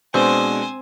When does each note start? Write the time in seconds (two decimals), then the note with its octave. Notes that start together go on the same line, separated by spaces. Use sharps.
0.14 B2 G#3 C4 D4 C5 G#5